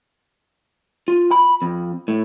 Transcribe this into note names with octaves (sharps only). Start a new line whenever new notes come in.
F4
B5
F2
A2